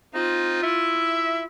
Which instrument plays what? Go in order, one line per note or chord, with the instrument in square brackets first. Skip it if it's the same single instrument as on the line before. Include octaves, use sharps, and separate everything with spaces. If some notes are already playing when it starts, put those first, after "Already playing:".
[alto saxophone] C4 [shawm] D#4 [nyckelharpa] F4
[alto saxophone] E4 [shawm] E5